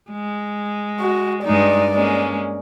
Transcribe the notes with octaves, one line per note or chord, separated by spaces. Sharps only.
G#3
F#4
G2 G#3 D#4 D5
G#3 A#3 C#4